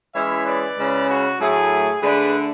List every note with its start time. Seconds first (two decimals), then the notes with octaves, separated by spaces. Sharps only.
0.14 E3 G#3 C#4 E4 C#5 E5
0.46 B4 D5
0.78 C#3 G#3 C#4 E4
1.09 F#4
1.39 A2 F#3 A3 E4 G#4
2.02 D3 A3 D4 G#4 B4